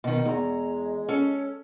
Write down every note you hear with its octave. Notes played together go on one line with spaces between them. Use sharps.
B2 D#3
E2 G#3 A#5
C#4 A4